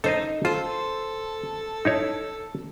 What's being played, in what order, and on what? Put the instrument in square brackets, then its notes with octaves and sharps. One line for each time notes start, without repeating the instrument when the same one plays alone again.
[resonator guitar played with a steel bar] D#4 [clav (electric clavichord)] A4 C5 D#5
[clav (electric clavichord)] F4 [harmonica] A4 [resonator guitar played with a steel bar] C5
[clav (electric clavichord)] D#4 E4 C#5